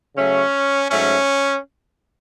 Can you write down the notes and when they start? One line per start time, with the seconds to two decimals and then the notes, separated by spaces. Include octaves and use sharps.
0.15 C#3 F#3 A3 C#4
0.90 G#2 F#3 A3 C#4